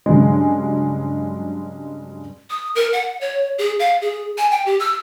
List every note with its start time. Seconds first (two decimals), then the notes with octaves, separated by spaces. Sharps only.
0.06 G2 C#3 F#3 G#3
2.50 D#6
2.75 A#4
2.93 F#5
3.21 C#5
3.58 G#4
3.80 F5
4.01 G#4
4.38 G#5
4.51 G5
4.66 G4
4.80 E6